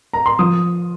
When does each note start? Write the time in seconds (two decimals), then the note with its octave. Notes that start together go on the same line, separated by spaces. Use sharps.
0.13 A#5
0.26 C6
0.39 F3 D#6